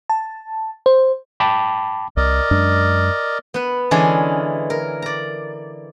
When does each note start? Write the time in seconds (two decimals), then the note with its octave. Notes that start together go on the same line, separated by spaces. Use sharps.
0.10 A5
0.86 C5
1.40 G5 A5 B5 D6
2.17 C2 A#4 D5 D#5
2.51 F#2 G#3 D4
3.54 B3 B4
3.91 D3 E3 G#3 C#4 D4 G#4
4.70 A#4
5.02 D5 A#5